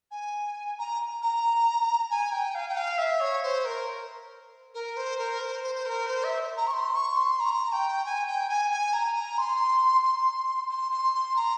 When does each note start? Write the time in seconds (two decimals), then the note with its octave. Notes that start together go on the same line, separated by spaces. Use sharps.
0.11 G#5
0.78 A#5
1.22 A#5
2.10 G#5
2.32 G5
2.55 F5
2.68 G5
2.77 F5
2.98 E5
3.20 C#5
3.43 C5
3.65 A#4
4.74 A#4
4.97 C5
5.18 A#4
5.40 C5
5.63 C5
5.75 C5
5.85 A#4
6.06 C5
6.24 E5
6.57 A#5
6.67 C#6
6.73 C6
6.96 C#6
7.17 C6
7.40 A#5
7.72 G5
8.06 G#5
8.27 G5
8.49 G#5
8.71 G#5
8.93 A#5
9.16 A#5
9.38 C6
10.03 C6
10.70 C6
10.92 C6
11.14 C6
11.36 A#5